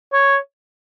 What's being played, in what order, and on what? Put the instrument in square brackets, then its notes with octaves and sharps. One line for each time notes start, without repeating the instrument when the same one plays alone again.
[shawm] C#5